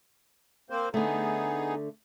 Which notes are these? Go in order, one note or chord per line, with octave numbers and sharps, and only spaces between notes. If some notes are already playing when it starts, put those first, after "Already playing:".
A#3 C4 C5
D3 A3 B3 D#4 G#4